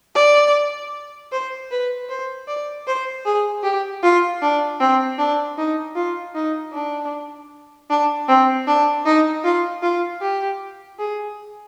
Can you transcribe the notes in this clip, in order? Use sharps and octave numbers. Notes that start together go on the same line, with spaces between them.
D5
C5
B4
C5
D5
C5
G#4
G4
F4
D4
C4
D4
D#4
F4
D#4
D4
D4
C4
D4
D#4
F4
F4
G4
G#4